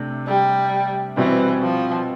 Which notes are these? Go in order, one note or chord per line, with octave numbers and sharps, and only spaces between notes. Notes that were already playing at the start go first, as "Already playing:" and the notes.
Already playing: C3 A3 D4
G3
B2 E3 G3 C4
F3